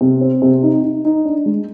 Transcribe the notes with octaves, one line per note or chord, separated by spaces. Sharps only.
C3
C4
C3
D#4
D#4
D#4
D4
G#3